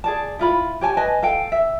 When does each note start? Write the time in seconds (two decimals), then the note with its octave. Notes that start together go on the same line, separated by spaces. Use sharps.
0.04 G#4 D5 A5
0.39 E4 F4 B5
0.81 G4 C#5 G#5 A5
0.97 B4 D#5 G#5 A5
1.23 A4 F5 G5
1.52 E5